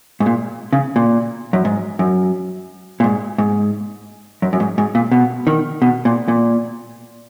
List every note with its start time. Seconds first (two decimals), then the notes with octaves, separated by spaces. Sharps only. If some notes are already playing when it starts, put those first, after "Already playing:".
0.20 G#2
0.26 A#2
0.73 C#3
0.96 A#2
1.53 F#2
1.65 G#2
1.99 F#2
3.00 A#2
3.04 G#2
3.38 G#2
4.42 F#2
4.53 F#2
4.60 G#2
4.78 G#2
4.95 A#2
5.12 B2
5.47 D#3
5.82 B2
6.05 A#2
6.28 A#2